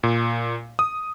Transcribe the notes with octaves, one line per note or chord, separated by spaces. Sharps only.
A#2
D#6